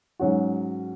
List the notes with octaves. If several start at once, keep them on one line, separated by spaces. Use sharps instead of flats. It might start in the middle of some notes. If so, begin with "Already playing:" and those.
G#2 F#3 C#4 F#4